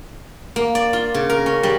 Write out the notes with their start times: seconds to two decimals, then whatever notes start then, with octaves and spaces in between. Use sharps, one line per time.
0.56 A#3
0.75 D5
0.93 F4
1.14 C#3
1.30 A#4
1.46 C#4
1.63 G3